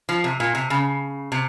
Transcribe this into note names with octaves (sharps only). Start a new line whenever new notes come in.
F3
C3
A#2
C3
C#3
C3